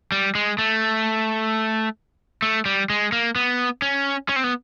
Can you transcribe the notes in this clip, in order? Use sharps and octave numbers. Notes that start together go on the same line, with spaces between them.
G3
G#3
A3
A3
G3
G#3
A#3
B3
C#4
C#4
C4
B3